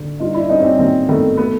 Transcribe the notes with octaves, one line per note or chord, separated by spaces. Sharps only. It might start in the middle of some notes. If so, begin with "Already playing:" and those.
Already playing: D3
G2 D#4 F4
D4 E4
G2 C#4 D#4
C#4
C4 D4
D#3 A#3 C4
D#3 A3 B3
A3 B3